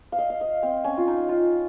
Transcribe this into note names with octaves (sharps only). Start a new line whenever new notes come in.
F5
D#5
F5
D#5
C4
C#4
F4
D#4
F4